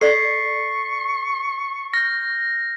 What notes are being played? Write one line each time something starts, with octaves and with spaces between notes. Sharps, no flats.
A4 D5 C#6 A6 B6 C7
F6 G6 A#6